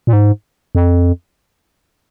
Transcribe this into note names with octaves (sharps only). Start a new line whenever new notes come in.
A#2
G#2
F2